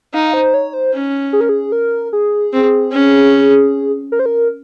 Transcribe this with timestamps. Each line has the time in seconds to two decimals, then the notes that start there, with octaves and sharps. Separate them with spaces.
0.14 D#4 F5
0.34 C5
0.54 C#5
0.74 C5
0.93 C#4
1.33 G#4
1.41 A#4
1.49 G#4
1.72 A#4
2.13 G#4
2.53 C4
2.92 C#4
4.12 A#4
4.19 C5
4.26 A#4